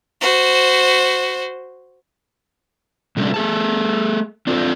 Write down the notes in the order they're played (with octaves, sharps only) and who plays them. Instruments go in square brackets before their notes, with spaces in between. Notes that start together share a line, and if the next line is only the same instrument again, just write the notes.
[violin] F#4 C5
[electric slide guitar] C3 G3 A3 B3 C#4 D4
A3 G#4 A5
C4 D4 F4 A4 C5